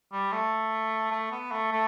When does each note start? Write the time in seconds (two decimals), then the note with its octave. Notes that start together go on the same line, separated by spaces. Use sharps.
0.13 G3
0.33 A3
1.11 A3
1.32 B3
1.51 A3
1.72 A3